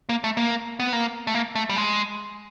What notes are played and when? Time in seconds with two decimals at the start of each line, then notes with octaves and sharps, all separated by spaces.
0.09 A#3
0.24 A3
0.37 A#3
0.80 B3
0.93 A#3
1.27 A3
1.35 A#3
1.55 A3
1.69 G3
1.76 G#3